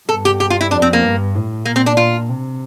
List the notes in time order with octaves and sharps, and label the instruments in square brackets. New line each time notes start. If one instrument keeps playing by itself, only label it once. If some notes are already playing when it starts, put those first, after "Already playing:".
[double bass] G2 [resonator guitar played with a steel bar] A4
[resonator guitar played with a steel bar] G4
G4
F4
E4
[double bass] F2 [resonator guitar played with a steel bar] D4
[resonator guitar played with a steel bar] C4
A#3
[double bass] G2
A2
[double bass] A#2 [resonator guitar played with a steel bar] A#3
[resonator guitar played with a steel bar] C4
D4
F4
[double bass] C3